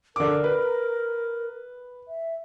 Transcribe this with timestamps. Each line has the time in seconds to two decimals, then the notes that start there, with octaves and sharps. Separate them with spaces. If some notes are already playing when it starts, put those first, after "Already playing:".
0.16 D3 A#4 D6
0.44 B4
2.08 E5